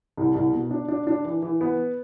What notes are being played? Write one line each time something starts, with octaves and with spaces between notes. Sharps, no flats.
C2
C2
B2
D4
D4
D4
E3
E3
B3